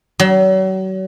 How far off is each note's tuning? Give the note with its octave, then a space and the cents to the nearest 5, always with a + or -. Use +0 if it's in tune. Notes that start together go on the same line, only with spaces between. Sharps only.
F#3 +40